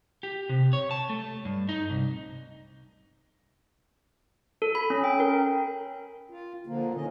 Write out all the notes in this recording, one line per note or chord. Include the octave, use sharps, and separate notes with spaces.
G4
C3
C#5
A5
A3
G2
D#4
C2
A4
B5
C#4
G5
A#4
F4
A#2 D3 F3 A#3
D#3 C#4 D#5